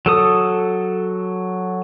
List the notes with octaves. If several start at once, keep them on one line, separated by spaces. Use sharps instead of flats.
F#3 A4 D#6